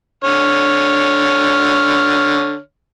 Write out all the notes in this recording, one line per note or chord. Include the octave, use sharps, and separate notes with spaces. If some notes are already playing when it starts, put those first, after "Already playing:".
D3 C#5 F6